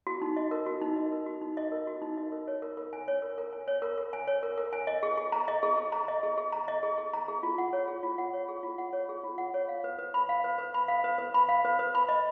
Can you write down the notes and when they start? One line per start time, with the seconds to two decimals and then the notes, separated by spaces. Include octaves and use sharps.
0.07 F#4
0.22 D#4
0.36 D#5
0.51 A#4
0.66 F#4
0.81 D#4
0.96 D#5
1.12 A#4
1.26 F#4
1.41 D#4
1.57 D#5
1.72 A#4
1.87 F#4
2.02 D#4
2.18 D#5
2.32 A#4
2.48 C#5
2.62 A#4
2.77 A#4
2.93 G#5
3.08 C#5
3.22 A#4
3.38 A#4
3.53 G#5
3.68 C#5
3.82 A#4
3.98 A#4
4.13 G#5
4.27 C#5
4.43 A#4
4.58 A#4
4.73 G#5
4.87 D#5
5.03 G#4
5.17 G#4
5.32 A#5
5.48 D#5
5.63 G#4
5.78 G#4
5.92 A#5
6.08 D#5
6.23 G#4
6.38 G#4
6.52 A#5
6.68 D#5
6.83 G#4
6.98 G#4
7.13 A#5
7.28 G#4
7.43 F4
7.58 F#5
7.73 C#5
7.88 G#4
8.03 F4
8.18 F#5
8.33 C#5
8.48 G#4
8.63 F4
8.78 F#5
8.93 C#5
9.09 G#4
9.24 F4
9.38 F#5
9.54 C#5
9.68 F5
9.84 B4
9.98 B4
10.14 B5
10.29 F5
10.44 B4
10.58 B4
10.74 B5
10.88 F5
11.04 B4
11.18 B4
11.34 B5
11.49 F5
11.65 B4
11.79 B4
11.95 B5
12.09 D#5